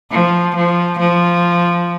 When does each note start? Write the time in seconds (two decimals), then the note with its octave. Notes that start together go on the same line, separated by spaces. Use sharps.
0.11 F3
0.56 F3
0.99 F3